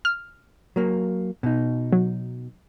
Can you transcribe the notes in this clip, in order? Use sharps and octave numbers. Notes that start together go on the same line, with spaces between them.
F6
F#3 A#3
B2 D#4
F#3